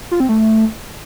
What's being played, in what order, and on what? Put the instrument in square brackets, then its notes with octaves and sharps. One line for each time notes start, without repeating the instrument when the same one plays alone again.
[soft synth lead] F4
C4
A3